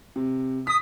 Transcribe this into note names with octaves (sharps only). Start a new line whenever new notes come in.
C3
D#6 B6